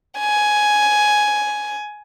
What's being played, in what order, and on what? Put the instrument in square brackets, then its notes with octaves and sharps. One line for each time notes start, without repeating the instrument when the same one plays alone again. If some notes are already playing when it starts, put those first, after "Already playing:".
[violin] G#5